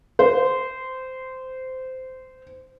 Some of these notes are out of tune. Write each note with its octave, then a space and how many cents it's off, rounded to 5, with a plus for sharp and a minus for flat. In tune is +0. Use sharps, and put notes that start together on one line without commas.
C5 -15